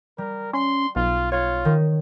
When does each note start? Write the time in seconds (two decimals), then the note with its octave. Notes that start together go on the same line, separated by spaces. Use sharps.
0.18 G3 A#4
0.53 C#4 C6
0.96 B1 F4
1.32 F4 C#5
1.65 D#3